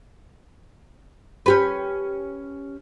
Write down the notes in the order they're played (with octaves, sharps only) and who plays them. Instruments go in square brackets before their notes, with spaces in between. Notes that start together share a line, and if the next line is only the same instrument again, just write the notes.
[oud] C#4 G4 B4